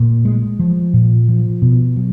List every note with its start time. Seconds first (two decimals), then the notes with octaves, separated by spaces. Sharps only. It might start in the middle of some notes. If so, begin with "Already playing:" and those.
Already playing: A#2
0.25 G#3
0.59 F3
0.93 A#2
1.28 F3
1.62 B2
1.96 F#3